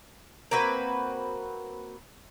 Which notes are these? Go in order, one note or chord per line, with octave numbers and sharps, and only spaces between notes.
A#3 C4 F#4 B4